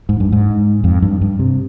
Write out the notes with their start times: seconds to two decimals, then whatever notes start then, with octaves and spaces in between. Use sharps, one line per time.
0.09 G#2
0.20 G2
0.32 G#2
0.84 F2
1.02 G2
1.22 G2
1.39 C3